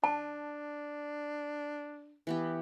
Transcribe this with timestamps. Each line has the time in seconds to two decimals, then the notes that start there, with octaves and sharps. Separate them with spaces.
0.04 D4 A5
2.27 E3 B3 G4